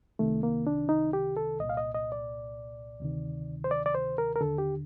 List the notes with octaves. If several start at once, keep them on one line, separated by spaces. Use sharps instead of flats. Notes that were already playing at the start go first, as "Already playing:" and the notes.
C2 C3 D#3 A3
A#3
D4
D#4
G4
A4
C2 A#2 D#5
F5
D#5
D#5
D5
D2 C3 D#3
C5
D5
D5
C5
A#4
A#4
D#2 D3 A4
G4